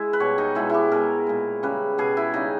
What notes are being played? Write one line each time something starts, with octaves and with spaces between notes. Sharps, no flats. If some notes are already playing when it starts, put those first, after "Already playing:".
Already playing: G#3 E4
B4
B2 G3 C#5
D#4
B2 G#3 E4
E4 G4
B2 G#3 A#4
A#2 G#3
C#3 G3 B4
B2 G3 G#4
E4
C#3 G3 D#4